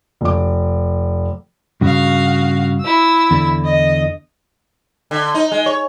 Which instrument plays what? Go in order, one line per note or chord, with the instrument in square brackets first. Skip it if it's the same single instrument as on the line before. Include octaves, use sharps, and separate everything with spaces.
[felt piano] F1 D6
[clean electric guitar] G2 C#3 [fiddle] F#4 F5
[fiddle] E4 E6
[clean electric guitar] E2 D3
[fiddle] D#5
[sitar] D3
D#4
G#3
C#5